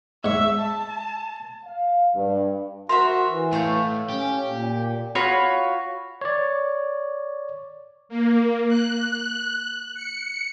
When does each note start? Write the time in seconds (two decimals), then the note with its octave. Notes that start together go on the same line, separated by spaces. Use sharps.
0.24 G#2 E5 C#6
0.60 A5
1.65 F5
2.15 G2
2.89 F#4 A#4 C5 E5 C6
3.27 E3
3.53 A2 A3 F5 G6
4.10 C#4 G4
4.43 A#2
5.15 F4 F#4 C#5 B5
6.21 C#5 D5
8.09 A#3
8.68 F#6
9.95 C#7